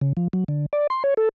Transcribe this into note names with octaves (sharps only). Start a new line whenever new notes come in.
C#3
F3
F#3
D3
D5
C6
C#5
A4